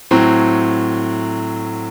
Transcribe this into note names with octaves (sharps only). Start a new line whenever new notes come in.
A2 F#3 C4